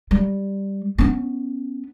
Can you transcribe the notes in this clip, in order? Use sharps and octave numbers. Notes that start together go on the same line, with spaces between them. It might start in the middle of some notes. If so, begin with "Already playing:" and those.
G3
B3 C#4